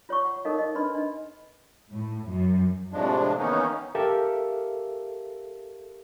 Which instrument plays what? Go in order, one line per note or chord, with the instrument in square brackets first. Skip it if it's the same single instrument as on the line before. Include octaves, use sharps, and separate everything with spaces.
[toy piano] F4 C#5 F#5 C#6
F#5
D#4 A4 A#4 C#5 D#5 F5
D#5
D4 D#4 B4 D#5 B5 C6
D4 D#5
[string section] A2
F#2
[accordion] F2 A2 C3 F3 G#3 D4
D#3 E3 A#3 B3 C#4 D#4
[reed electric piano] G4 A4 A#4 E5 F5